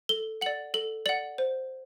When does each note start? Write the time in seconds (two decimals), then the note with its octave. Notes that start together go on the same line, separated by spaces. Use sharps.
0.09 A4 G7
0.41 D5 F#5 F#7
0.74 A4 F#7
1.06 D5 F#5 F#7
1.38 C5